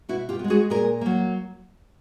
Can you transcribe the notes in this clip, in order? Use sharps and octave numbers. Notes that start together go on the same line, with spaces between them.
B2 E4 F#4
F4 G4
B3
G#3
F#4 G#4
A#2 G#4 A#4
F#3 A#3